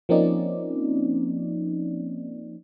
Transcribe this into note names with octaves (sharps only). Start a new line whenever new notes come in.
F3 A#3 C4 C#4 D#4 D5